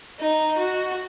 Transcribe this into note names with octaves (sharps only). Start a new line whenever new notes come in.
D#4
F#4